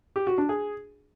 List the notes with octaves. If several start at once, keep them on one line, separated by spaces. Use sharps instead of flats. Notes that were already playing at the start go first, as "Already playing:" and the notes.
G4
F#4
D4
G#4